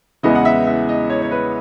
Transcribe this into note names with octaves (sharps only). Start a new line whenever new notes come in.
E2 C#3 G#3 B3 E4 D#5
F#5
E5
E5
D#5
C#5
C#5
B4